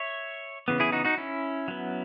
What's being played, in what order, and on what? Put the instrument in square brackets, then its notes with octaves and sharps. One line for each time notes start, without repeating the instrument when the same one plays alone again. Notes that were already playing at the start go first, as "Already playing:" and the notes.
Already playing: [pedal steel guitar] C#5 E5
C#3 E3 B3
E4 G#4
D#4 F#4
D#4 F#4
C#4 E4
F#3 B3